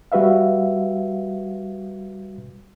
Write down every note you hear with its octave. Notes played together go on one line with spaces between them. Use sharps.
G3 F#4 B4 E5 F5